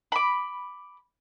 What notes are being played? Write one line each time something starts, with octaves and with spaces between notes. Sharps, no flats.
B5 D6